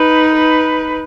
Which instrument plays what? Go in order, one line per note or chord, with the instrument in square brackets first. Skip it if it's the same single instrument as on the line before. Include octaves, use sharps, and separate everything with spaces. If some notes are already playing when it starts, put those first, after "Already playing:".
Already playing: [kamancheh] D#4 [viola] B4
[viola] B4